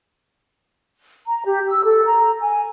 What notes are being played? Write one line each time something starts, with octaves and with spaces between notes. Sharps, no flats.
A#5
G4
E6
A4
A#5
G#5